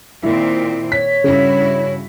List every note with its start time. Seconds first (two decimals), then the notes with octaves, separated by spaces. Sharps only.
0.23 A#2 D#3 C4 E4
0.92 C#5 B6
1.24 G2 C#3 E4 F#4